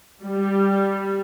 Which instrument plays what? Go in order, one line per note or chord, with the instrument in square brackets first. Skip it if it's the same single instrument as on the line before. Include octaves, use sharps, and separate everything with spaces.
[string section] G3